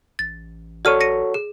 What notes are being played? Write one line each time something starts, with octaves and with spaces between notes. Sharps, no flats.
A1 A6
F#4 A4 C#5 D5 F6 D#7
A#6 C#7 D#7
G#4